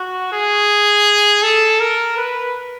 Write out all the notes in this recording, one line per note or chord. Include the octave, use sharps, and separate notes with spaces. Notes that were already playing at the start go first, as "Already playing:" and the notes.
Already playing: F#4
G#4
A4
A#4
B4